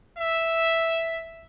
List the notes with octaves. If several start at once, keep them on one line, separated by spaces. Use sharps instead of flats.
E5